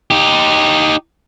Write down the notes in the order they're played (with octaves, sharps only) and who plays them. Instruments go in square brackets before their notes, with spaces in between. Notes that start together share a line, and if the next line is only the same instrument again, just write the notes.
[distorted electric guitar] D#4 G4